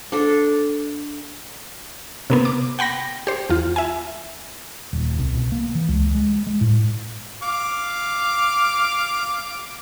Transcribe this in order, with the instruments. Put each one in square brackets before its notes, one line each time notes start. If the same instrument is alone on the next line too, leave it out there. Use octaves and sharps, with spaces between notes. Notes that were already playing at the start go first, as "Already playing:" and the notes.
[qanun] D4 A4
[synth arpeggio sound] C3 A#3 B3
D6
F#5 G5 B5 A#6
G4 C5
E2 F4
E5 G#5
[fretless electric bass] D#1
C2
B2
A#3
E3
C#2
G#3
G#3
A2
[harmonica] F5 D6